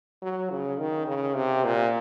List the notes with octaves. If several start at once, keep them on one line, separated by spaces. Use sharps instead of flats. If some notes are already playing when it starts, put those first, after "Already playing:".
F#3
C#3
D#3
C#3
C3
A#2